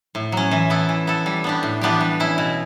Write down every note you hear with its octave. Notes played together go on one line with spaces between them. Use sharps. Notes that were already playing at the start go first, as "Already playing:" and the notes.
A2
F#3 C#4
E3
B3 E4 A4
E3
B3 E4 A4
G3
B3 D4 G4
A2
E3 B3 D4 G4
G3
C#4 E4
B2